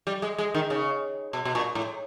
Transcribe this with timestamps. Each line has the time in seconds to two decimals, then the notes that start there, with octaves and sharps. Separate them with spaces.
0.07 G3
0.22 G#3
0.38 G#3
0.54 D#3
0.70 C#3
1.33 B2
1.45 B2
1.55 A#2
1.75 A2